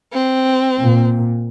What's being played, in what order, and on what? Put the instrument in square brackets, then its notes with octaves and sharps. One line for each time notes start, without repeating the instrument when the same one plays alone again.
[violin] C4
[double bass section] A#2